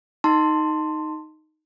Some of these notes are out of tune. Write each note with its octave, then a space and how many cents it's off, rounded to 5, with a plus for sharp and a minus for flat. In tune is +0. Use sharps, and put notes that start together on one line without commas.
D#4 +0 A5 +30 C6 +0